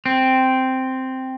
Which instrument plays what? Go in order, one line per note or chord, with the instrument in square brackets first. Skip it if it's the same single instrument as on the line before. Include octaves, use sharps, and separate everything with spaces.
[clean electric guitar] C4